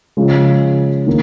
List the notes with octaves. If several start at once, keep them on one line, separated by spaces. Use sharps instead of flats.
C#3 F3 G#3
D#3 A#3